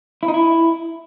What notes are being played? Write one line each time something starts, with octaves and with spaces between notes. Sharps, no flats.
E4
D#4
E4